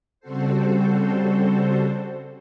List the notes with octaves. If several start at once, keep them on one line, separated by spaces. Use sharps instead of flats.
C#3 G3 C4 F#4 A4 C5